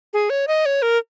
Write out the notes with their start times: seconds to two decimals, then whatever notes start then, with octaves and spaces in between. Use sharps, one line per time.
0.13 G#4
0.30 C#5
0.48 D#5
0.66 C#5
0.82 A#4